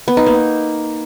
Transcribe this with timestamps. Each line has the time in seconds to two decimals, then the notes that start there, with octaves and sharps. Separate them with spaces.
0.08 B3
0.17 D#4
0.26 A#3